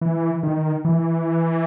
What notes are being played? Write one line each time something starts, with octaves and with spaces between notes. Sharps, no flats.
E3
D#3
E3